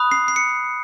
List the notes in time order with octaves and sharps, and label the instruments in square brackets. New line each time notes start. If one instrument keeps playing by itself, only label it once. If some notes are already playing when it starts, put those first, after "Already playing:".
Already playing: [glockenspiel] B5 D#6 F#6
C7
C7
C#7